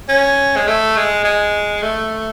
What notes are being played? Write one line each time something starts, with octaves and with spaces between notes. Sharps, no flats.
C#4
G#3
A3
G#3
G#3
A3